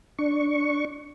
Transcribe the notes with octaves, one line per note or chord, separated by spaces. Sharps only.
D4 C#6